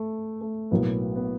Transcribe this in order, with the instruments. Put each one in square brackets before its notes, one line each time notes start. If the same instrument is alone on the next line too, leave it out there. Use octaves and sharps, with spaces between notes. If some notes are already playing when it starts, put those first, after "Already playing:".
Already playing: [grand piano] A3
A3
[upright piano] B1 A2 F#3 A#3 [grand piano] B3
[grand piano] B3